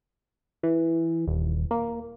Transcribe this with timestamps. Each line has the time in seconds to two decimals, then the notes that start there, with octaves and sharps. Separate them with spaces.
0.63 E3
1.27 D#1
1.71 A#3